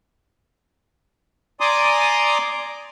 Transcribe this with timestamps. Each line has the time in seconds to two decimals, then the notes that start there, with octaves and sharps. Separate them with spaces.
1.60 D5 G#5 A#5 C6 D6 D#6